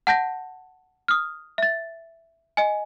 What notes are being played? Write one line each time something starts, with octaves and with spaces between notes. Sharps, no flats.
F#5 A5 G6 A#6
D#6 F6
E5 A6
D#5 G#5